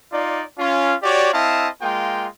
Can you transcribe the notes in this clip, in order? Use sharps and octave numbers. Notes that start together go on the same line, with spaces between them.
D#4 F4 D5
C#4 F4
F#4 G4 C#5 D5
C4 E4 D#5 F5 A5
G#3 A#3 F4 G5